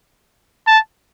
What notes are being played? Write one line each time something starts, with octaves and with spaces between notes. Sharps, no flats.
A5